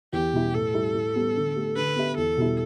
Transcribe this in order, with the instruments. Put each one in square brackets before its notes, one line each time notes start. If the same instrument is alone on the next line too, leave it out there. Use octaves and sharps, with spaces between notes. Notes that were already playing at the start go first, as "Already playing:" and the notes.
[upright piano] E2 [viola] G4
[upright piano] B2 G3 E4
[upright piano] A2 [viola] A4
[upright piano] G3 E4 G4
A2
G3 B3 G4
D3
A3 G4
[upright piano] D3 [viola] B4
[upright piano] B3 G4 E5
[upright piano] E2 [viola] A4
[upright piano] B2 G3 E4